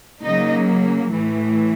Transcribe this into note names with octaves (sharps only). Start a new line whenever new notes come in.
C#3 F#3 A#3 D#4 D#5
A2 E3 A3